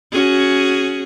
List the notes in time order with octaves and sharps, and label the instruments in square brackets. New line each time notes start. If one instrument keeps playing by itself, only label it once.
[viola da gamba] C#4 F#4 G#4